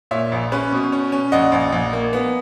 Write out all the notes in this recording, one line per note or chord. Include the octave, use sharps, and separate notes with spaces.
A#2 C#5 E5
A#1
C#4 B4
B2
C#4
C#4
A#1 D#5 F#5
A#1
A#1
A#3
B3